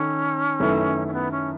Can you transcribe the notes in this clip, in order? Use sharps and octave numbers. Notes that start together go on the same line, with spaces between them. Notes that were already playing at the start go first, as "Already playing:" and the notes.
Already playing: D#3 C#4 A4
F#2 D#3 A3 E4 B4
C#4
B3
C#4